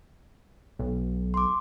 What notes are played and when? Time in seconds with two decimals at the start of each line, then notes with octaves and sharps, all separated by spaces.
0.79 B1
1.34 C6 D6